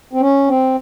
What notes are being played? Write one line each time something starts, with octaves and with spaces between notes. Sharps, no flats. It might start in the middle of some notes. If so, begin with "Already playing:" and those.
C4
C#4
C4